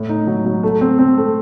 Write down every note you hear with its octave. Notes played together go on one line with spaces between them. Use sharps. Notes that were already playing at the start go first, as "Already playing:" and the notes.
Already playing: A2
D#4
F#3
F#3
A3
C4
C4
A3